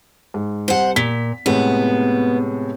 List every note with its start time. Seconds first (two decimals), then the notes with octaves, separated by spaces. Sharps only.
0.34 G#2
0.68 C2 C5 F#5
0.96 A#2 B6
1.46 A2 C3 G#3 B3